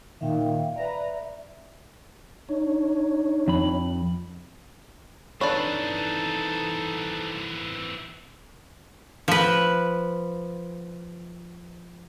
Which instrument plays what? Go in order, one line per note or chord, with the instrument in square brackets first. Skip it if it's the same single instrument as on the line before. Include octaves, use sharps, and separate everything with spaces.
[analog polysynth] A#2 D#3 [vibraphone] E5 F5 G5
[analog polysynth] B4 A#5 [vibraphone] D5 E5
[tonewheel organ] D4 D#4 C#5
[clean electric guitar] F2 B5
[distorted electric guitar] E3 C4 [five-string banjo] D4 B4 C#5 [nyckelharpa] D#4 A4
[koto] F3 B4